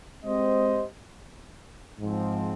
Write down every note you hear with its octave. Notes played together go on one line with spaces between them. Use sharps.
G#3 C4 G4 C5 D#5
G#2 F3 C4